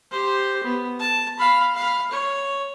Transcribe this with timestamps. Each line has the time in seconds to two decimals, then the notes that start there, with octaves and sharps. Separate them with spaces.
0.11 G4 C5
0.63 B3
0.99 A5
1.39 F5 B5
1.75 F5 B5
2.11 C#5